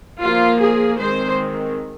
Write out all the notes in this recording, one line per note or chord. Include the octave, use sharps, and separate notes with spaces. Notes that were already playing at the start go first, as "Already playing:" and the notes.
F3 A#3 F4
G#4
D#3 G#3 C4 C5